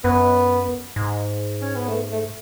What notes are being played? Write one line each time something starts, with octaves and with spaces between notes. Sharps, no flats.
F#2 B3
G#2
C#4
B3
A3
A3